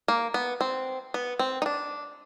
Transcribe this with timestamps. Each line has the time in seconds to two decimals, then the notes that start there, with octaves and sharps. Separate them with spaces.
0.08 A#3
0.34 B3
0.61 C4
1.14 B3
1.39 C4
1.62 D#4
1.66 D4